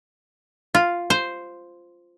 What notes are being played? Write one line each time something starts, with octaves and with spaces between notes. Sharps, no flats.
F4
C5